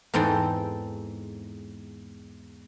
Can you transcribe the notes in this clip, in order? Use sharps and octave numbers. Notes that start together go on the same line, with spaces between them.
E2 G#2 C4 A4 G5 C6